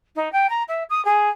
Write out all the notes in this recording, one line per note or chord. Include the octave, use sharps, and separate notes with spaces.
D#4
G5
A#5
E5
D#6
G#4